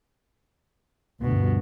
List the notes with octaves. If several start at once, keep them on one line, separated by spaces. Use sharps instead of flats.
D2 G2 B2